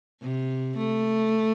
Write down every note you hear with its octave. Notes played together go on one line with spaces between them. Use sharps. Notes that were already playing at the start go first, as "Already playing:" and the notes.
C3
A3